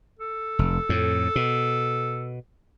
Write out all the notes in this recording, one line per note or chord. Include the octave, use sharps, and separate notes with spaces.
A4
F1
F2 A2
B2